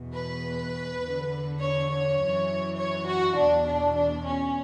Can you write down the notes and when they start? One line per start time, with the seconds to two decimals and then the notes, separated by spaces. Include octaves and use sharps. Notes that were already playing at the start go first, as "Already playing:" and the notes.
Already playing: E2 B2
0.12 B4
1.00 E2 D3
1.59 C#5
1.89 C#5
2.19 F#2 E3
2.77 C#5
3.06 F#4
3.36 E2 B2 D4
3.66 D4
3.95 D4
4.25 C#4